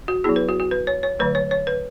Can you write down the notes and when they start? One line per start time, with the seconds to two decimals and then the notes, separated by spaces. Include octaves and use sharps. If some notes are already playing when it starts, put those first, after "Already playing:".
0.08 F#4
0.24 F#3 B3 E4 G#4
0.36 B4
0.49 F#4
0.60 F#4
0.71 B4
0.87 C#5
1.03 C#5
1.19 D3 F#3 A3 B4
1.35 C#5
1.51 C#5
1.67 B4